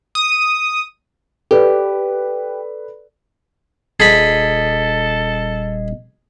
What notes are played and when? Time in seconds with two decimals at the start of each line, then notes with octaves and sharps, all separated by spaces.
0.15 D#6
1.51 G4 A4 B4 D5
4.00 D#1 G#4 A4 D#5 B5